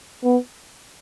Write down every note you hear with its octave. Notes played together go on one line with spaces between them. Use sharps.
B3